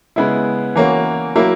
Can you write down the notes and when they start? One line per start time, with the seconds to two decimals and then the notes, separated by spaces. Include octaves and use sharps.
0.16 C#3 G#3 B3 E4
0.75 E3 A#3 C#4 F#4
1.36 F#3 A#3 E4